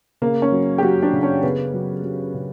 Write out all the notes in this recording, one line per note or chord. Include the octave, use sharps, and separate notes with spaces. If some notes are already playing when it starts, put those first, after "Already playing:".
C#3 A#3
C#4
F#3
G4
F#3 F#4
D4
C#3
C#4
C#3 B3
F#3
F#3
C#3